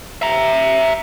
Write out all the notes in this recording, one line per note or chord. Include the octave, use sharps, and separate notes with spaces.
E5 A#5